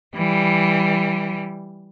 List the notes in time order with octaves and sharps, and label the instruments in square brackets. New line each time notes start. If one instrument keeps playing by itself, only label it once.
[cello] E3 G3